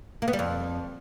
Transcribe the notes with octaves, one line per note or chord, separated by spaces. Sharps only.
A#3
B3
G3
F2